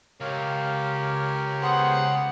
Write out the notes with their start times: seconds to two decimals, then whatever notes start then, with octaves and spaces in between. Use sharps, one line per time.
0.20 C#2 G4 A#4 C#5 F5
1.62 B3 G#4 C5 F#5